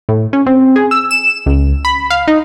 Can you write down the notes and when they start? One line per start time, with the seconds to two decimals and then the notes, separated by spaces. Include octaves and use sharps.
0.09 A2
0.33 C#4
0.46 C4
0.76 G#4
0.91 E6
1.11 E7
1.46 C#2
1.85 B5
2.10 F5
2.28 D#4